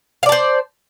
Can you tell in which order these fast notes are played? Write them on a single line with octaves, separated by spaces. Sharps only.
F5 D5 A5 C5